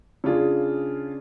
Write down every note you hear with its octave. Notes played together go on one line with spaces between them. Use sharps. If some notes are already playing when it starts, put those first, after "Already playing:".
C#3 D4 F4 G#4